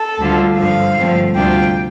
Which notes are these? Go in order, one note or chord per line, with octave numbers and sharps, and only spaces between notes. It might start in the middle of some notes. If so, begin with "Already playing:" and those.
Already playing: A4
D2 D3 G3 D4 F4
G2 D3 F3 F5
G2 D3 F3 A3 C4
D2 C3 G3 D4 F4 G5